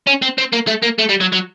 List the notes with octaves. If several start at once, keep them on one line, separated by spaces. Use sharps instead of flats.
C#4
C4
C4
A#3
A3
A#3
A3
G3
F#3
F#3